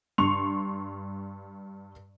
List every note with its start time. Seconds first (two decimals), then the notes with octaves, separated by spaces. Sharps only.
0.18 G2 C6 C#6 F7